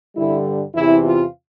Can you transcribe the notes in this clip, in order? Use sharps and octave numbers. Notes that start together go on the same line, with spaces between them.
G2 D3 G3 E4
E2 C3 E3 E4
F4